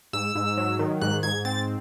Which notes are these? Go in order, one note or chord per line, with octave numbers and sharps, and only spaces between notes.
G#2 E6
G#2
F#3
D#3
G#2 F#6
G#2 G#6
C4 A6